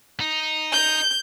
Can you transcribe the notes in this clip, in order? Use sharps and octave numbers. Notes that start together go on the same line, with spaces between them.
D#4
G6